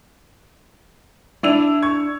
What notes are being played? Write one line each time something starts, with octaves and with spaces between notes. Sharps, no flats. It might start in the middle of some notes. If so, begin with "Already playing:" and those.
D4 E4 E6 F7
C#6 G#6